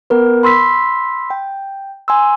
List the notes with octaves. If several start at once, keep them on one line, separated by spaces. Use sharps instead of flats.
B3 A#4 B4
B5 C6 E6 B6
G5
G#5 C6 E6